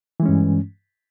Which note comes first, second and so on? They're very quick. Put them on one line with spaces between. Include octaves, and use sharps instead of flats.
E3 G#3 C#4 G2